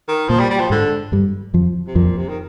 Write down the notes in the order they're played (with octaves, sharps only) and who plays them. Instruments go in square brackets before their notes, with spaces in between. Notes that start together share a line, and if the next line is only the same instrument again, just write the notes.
[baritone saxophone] D#3
[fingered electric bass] A#2 A#3 [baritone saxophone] F3
[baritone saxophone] G3
G3
F3
[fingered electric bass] G#2 G#3 [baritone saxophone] D3
[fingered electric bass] G2 G3
F2 F3
[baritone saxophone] C3
[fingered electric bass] F2 F3 [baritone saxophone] A#2
[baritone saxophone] C3
D#3